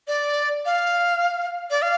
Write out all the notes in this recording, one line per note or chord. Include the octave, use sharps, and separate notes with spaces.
D5
F5
D5
F5